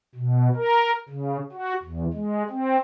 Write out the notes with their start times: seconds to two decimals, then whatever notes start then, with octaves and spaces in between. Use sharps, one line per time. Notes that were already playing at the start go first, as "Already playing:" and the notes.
0.15 B2
0.55 A#4
1.09 C#3
1.52 F#4
1.83 E2
2.13 G#3
2.50 C4